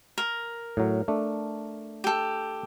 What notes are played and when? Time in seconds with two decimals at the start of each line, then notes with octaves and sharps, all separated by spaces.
0.18 A#4
0.77 A2 F#3
1.08 A3 D4
2.04 G4 A4